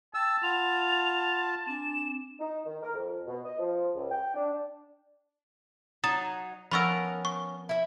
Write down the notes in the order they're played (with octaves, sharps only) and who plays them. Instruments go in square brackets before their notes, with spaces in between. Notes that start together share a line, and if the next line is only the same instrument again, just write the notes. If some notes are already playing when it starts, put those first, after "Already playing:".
[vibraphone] G5 [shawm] A5 [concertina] E6
[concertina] F4 [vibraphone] F#5 B5 [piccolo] F7
[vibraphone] C4 D4 G#5 [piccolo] E7
[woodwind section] D#4
D#3
A#4
F2
B2
D#5
F3
C#2
G5
D4
[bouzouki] F#3 D#4 [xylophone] D#6 A6 E7
[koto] F3 B3 A#4 [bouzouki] C#4 [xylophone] B5 C#6 E6
[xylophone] C#6
[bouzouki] E4 E5